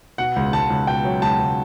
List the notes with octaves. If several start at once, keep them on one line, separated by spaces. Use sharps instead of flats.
B2 F#5
C#2
C#2 A5
C#2
B2 G5
F#3
C#2 A5
C#2